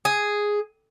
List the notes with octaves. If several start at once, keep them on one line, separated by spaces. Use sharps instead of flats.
G#4